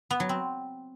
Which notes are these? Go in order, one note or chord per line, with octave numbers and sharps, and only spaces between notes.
B3
F#3
C4